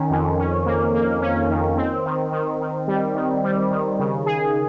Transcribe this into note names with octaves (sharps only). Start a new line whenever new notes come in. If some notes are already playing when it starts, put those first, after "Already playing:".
Already playing: D#3 C#4
F2
C#4
A#3
A#3
C#4
D#3
C4
D#3
D#3
D#3
G3
D#3
G3
D#3
C#3
G#4